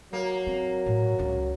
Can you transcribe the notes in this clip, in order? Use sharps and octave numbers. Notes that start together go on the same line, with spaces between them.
F#3 A#3
C4
A2
C#2 F4